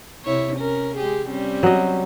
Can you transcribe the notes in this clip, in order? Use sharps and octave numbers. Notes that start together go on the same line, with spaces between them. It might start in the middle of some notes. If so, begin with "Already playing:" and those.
C3 E4 C#5
C#4 A#4
G#3 G4 G#4
G3 C4 C#4
F#3 D#5